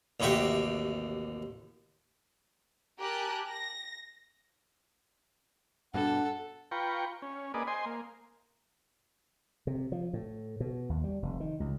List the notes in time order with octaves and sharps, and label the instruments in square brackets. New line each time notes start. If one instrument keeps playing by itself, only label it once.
[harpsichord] A1 D#2 C3 F#4 E5 G5
[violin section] G4 A#4 G#5 A5 F#6
A#6
[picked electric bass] G2 B2 [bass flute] D4 [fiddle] A4 [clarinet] F#5
[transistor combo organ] F4 B4 G5 A#5 C#6
C#4
A#3 G#4 B4 D5 D#5
C5 D#5 G#5 C6
A#3
[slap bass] C3
F3
A2
B2
D#2
G3
F1
D#3
C#2